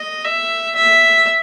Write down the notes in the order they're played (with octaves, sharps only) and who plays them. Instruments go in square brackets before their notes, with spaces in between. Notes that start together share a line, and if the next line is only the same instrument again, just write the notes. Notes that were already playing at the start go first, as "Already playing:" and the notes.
Already playing: [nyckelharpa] D#5
E5
E5